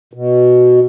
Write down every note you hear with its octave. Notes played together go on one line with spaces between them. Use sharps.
B2